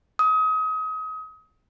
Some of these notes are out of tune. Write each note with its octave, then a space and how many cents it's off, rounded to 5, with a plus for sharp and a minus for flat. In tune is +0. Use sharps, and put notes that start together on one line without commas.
D#6 +30